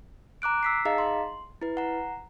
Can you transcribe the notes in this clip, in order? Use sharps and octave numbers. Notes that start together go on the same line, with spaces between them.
A#5 D6 F#6 D7
E6 B6 C7
D#4 G#4 D#5 F5 A#5
C6
E4 B4
F#5 A#5